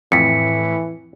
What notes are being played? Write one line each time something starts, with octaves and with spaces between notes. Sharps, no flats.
F2 A2 E3 B6 C#7